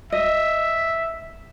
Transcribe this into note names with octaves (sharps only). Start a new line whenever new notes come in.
D#5 E5